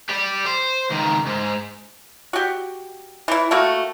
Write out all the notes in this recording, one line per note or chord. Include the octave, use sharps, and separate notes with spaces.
G4 D5
C5
C#2 D#3
G#2
F#4 G4
E3 E4
A3 A#3 F#4